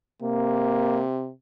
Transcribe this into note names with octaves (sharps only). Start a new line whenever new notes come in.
C3 A#3